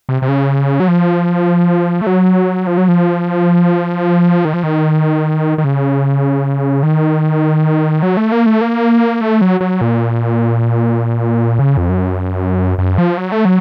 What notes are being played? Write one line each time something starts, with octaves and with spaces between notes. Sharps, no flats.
C3
C3
C#3
F#3
F3
A3
F#3
F3
F#3
F3
D#3
F3
D#3
D#3
C#3
D#3
F#3
A3
A#3
A3
A#3
A3
F#3
F#3
A#2
C#3
F2
F#2
F#2
F3
F#3
A3
F#3